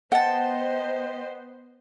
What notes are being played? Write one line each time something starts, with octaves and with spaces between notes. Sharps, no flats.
B3 C5 D#5 F#5 G5 A5